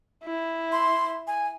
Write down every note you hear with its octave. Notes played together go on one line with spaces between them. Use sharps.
E4
C6
G#5